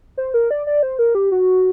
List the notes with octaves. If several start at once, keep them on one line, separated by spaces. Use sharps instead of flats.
C5
A#4
D5
D5
C5
A#4
G4
F#4